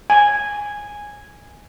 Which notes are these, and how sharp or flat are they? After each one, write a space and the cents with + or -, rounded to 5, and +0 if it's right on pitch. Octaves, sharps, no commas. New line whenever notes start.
G#5 -5